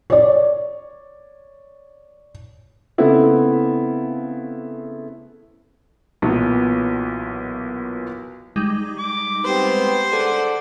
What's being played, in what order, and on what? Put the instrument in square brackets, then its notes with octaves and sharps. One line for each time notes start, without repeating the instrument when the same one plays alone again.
[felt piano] C#5 D5
[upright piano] C#3 A3 B3 C4 E4 A4
[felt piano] B1 A#2 E3 B3
[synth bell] G3 G#3 D#4
[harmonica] D6
[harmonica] B3 C4 G4 [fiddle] C5
[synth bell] G#4 [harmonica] A4 D5 F#5